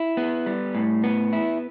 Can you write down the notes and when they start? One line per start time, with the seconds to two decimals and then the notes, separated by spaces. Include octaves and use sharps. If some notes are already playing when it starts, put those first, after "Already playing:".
Already playing: E4
0.17 B3
0.46 G3
0.75 A2
1.04 B3
1.33 E4